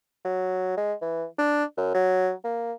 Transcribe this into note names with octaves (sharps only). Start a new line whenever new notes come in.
F#3
G#3
E3
D4
F#2
F#3
A#3